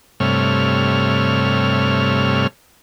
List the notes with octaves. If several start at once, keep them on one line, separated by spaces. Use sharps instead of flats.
G2 C3 A3 C#5 F6